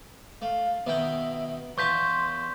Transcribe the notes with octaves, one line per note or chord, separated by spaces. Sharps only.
A3 F5
B2 D#3 E5 G5
E2 F4 A5 C6 C#6 G6 B6